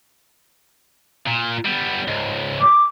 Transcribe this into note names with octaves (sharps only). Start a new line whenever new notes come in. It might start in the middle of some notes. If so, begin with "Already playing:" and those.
A#2
G3 B3
C#2 G#2
D6